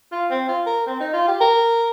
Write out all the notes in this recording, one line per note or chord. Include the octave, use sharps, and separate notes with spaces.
F4
C4
F4
A#4
C4
D#4
F4
G4
A#4